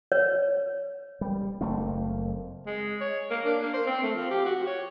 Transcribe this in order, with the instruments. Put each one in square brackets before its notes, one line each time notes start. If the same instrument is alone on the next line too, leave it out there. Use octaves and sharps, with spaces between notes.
[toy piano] C#5
[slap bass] G3
F#1 A3 A#3 C4
[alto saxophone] G#3
C#5
A#3
D4
A#3
C5
C4
A3
F3
G4
F#4
C#5